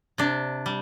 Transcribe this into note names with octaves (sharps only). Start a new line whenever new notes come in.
C3 D4
G3